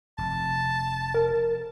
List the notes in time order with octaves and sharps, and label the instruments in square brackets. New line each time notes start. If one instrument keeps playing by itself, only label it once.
[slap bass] F1 [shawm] A5
[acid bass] A#4